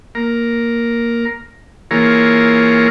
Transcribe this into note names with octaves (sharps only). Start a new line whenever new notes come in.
A#3 A#4
E3 A#3 F4 G#4 A#4 C#5